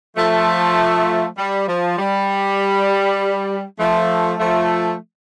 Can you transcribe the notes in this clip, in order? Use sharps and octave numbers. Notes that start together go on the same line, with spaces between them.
F3 A3
G3
F3
G3
F3 A3
F3 A3